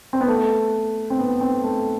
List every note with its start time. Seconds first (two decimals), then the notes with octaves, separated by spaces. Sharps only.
0.13 C4
0.21 B3
0.28 A3
1.10 C4
1.19 B3
1.41 C4
1.64 A3